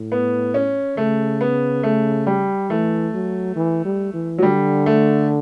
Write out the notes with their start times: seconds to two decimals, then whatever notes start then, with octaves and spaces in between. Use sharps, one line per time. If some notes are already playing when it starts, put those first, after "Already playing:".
Already playing: A2
0.12 B3
0.54 C#4
0.97 C#3 A3
1.41 B3
1.83 A3
2.26 G3
2.70 E3 A3
3.14 F#3
3.56 E3
3.85 G3
4.14 E3
4.38 F#3
4.43 D3 G3
4.86 A3